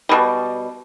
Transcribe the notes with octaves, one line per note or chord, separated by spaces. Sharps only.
B2 G3